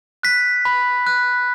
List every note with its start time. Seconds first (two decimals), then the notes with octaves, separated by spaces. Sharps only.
0.23 F#6 B6
0.65 B5
1.07 F#6